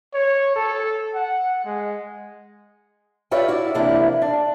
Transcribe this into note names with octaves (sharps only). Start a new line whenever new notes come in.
C#5
A4
F#5
G#3
F4 G4 B4 C#5 D5 E5
E4 F#4 C#5 D5
C3 E3 F3 A#3 D4 E4
D4